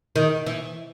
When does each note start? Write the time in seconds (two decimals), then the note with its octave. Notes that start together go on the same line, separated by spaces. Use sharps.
0.16 D#3
0.46 E3